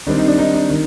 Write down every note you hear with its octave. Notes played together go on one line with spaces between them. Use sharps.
D#3 G3 C4 D4
D#4
D4
D#4
D#4
D#3